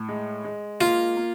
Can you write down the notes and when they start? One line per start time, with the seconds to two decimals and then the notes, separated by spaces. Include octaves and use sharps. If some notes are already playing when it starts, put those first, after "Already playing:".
Already playing: A2
0.09 G#3
0.44 G#3
0.81 A#3 F4
1.17 A#3